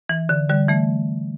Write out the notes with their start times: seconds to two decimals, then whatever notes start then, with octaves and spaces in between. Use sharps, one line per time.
0.09 E3
0.29 D3
0.49 D3 G3
0.69 E3 A3